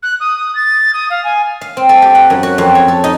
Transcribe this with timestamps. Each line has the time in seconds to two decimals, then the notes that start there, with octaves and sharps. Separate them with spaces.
0.03 F#6
0.20 D#6
0.36 D#6
0.55 A6
0.93 D#6
1.10 F5
1.24 G#5
1.61 F5
1.77 C4
1.89 A4
2.02 G4
2.15 F#5
2.30 F#2
2.43 F#4
2.58 F2
2.75 C#5
2.88 A4
3.04 D#4